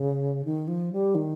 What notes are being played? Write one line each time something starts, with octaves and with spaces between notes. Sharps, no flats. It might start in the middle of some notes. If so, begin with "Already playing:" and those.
Already playing: C#3
D#3
F3
G3
D#3